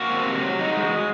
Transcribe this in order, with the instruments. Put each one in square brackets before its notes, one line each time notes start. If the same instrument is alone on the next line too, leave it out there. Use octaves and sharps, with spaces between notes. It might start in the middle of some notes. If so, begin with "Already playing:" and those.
Already playing: [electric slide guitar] A#3 F#4
C4
C3
F#3
D#4
G#3